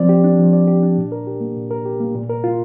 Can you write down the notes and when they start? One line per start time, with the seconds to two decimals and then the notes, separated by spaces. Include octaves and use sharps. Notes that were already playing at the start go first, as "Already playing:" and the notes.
Already playing: F3 C4 D5
0.09 G4
0.24 D4
0.39 F3
0.53 D5
0.67 G4
0.83 D4
0.97 A#2
1.12 A#4
1.27 G4
1.41 A#3
1.56 A#2
1.71 A#4
1.85 G4
2.00 A#3
2.15 A#2
2.29 A#4
2.44 F4